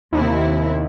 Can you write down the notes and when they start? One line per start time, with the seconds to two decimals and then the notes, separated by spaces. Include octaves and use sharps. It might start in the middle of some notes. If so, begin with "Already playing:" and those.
0.13 D#2 C3 E4